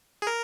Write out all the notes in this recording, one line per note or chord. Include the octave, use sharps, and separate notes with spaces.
G#4
A#4